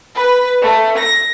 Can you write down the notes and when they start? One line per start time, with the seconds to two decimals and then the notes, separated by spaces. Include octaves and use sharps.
0.16 B4
0.62 A3
0.97 A#6